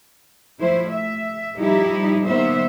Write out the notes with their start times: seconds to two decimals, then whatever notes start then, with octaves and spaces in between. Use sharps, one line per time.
0.59 F3 A3 E4 C5
0.90 E5
1.58 F3 G3 D#4 E4 G4
2.24 D#3 G3 A#3 B3 C5 E5